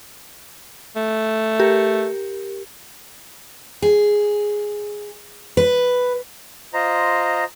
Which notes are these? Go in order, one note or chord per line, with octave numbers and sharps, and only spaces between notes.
A3
G4 A#4
G#4
B4
F4 C5 D#5 A#5